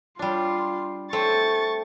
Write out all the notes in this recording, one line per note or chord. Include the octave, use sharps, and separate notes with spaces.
G3 D4 F4 C6
A3 C4 C5 C#6 A6